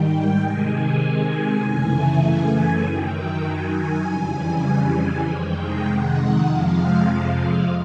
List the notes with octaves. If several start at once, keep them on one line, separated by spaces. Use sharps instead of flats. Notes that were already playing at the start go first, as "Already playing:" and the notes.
Already playing: G#2 D#3 G3 G5
C3 D#3 G#3 G#5
F#2 C#3 E3 A3
G#5
F#2 D#3 F#3 G5
G#5
F2 C#3 E3 G3
F2 C3 D#3 G#3 G5
F#5
F2 C3 F3 G#3 F5